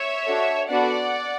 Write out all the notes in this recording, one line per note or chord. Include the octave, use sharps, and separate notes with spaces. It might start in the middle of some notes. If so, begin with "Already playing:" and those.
Already playing: C#5 E5
D4 F#4 A4
B3 D4 F#4 A4 D5 F#5